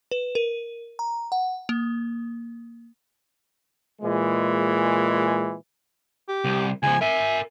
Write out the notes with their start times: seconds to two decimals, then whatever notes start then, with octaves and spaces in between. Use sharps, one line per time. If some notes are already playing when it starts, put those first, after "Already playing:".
0.11 B4
0.35 A#4
0.99 A#5
1.32 F#5
1.69 A#3
4.02 A#2 E3 G#3
6.28 G4
6.45 C2
6.83 C#2 F3 G#5
7.01 A#4 E5 G#5